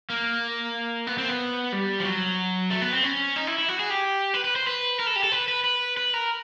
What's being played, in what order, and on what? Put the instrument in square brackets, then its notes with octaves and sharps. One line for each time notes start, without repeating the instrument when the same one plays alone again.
[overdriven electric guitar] A#3
B3
C4
B3
G3
F3
F#3
A3
B3
C4
C#4
D#4
E4
E4
F#4
G#4
G4
B4
B4
C5
B4
A#4
A4
G4
A4
B4
B4
B4
B4
A#4